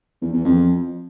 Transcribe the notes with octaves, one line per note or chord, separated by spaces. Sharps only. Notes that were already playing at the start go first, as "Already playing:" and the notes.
E2
E2
F2